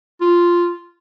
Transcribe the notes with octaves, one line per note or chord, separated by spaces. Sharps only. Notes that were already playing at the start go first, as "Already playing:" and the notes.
F4